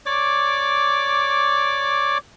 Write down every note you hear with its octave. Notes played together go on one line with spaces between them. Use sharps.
C#5 D5 D6